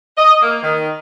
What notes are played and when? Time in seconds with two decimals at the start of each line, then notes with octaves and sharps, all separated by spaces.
0.18 D#5
0.42 A#3
0.63 D#3